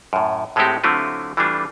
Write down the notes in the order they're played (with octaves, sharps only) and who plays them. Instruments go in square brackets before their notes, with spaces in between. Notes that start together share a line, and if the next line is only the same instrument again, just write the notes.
[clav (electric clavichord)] F#2 A2
A2 G#3 A3 C4 F#4 G4
D3 F#3 A3 C4 E4 F4
E3 G3 A3 D4 F4